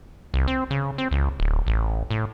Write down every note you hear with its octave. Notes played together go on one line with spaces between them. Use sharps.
C2
C4
C#3
C4
C#2
D1
A1
A2